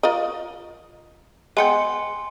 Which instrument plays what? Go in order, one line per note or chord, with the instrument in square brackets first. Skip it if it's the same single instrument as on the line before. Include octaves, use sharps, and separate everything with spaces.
[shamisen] F4 A#4 D#5
[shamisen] G#3 B3 G5 [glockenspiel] G#5 C6 C#7